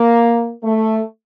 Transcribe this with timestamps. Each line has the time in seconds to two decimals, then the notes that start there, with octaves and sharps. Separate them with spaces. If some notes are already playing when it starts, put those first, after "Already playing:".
Already playing: A#3
0.63 A3